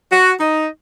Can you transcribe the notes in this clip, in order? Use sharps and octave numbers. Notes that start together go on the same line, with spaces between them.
F#4
D#4